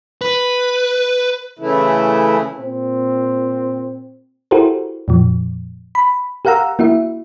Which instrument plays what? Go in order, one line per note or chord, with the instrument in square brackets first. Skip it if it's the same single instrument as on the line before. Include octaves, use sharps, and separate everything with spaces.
[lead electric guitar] B4
[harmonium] C#3 E3 A3 E4
[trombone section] A#2 C4
[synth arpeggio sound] E4 F#4 G4 A4 A#4 C5
F2 A#2 F3
B5
G4 A#4 F5 F#5 A#5 E6
A#3 E4 F#4 E5